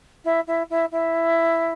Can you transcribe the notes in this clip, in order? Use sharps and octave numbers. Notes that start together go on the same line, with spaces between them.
E4
E4
E4
E4